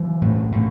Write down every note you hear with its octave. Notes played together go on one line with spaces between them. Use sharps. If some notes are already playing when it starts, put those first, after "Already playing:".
Already playing: E3 F#3
A2
A2